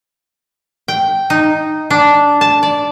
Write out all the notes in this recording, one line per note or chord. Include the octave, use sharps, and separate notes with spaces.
G5
D#4
D4
A5
D5